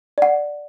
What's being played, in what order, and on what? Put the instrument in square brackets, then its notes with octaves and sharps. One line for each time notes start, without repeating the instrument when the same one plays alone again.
[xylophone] D5 F#5